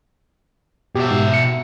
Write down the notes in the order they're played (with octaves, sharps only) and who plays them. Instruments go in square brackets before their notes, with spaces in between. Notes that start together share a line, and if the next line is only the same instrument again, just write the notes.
[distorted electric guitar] B2 E5 [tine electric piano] G4
[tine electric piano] G#2
C#7